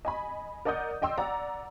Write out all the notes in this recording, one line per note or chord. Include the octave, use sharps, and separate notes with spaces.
D#5 G#5 B5
A#4 D5 D#5 F#5 D#6 G6
D5 D#5 G5 C6 E6
D5 F#5 A#5